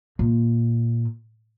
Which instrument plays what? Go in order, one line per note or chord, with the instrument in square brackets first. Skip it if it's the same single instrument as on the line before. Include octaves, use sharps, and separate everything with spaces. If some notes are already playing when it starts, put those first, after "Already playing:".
[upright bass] A#2